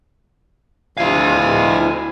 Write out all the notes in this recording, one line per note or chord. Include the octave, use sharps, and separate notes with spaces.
D2 F3 E4 F5 G#5